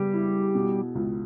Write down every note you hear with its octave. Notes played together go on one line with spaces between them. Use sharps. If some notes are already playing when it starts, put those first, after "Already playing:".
Already playing: C#3 G3 B3 G4
E4
B2
C#2